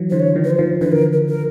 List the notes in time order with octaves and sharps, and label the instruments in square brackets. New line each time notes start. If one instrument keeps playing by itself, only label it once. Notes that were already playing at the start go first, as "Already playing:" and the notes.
Already playing: [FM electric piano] E3 F#3
[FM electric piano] D3 E3 [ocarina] C5
[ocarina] C#5
[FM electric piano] D#3 F3
[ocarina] B4
C5
[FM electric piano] D#3 F3
[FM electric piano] D3 E3 [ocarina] B4
[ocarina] A#4
A#4
A#4